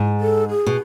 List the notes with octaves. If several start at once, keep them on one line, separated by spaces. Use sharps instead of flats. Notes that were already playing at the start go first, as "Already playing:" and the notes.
Already playing: G#2
A4
G#4
B2